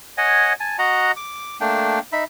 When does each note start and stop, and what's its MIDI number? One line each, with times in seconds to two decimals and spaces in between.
0.18 0.53 73
0.18 0.53 75
0.18 0.53 78
0.18 0.53 80
0.60 0.77 80
0.60 0.77 81
0.79 1.12 66
0.79 1.12 75
0.79 1.12 78
0.79 1.12 82
1.17 1.57 86
1.61 2.00 57
1.61 2.00 58
1.61 2.00 62
1.61 2.00 79
2.12 2.24 63
2.12 2.24 76
2.12 2.24 83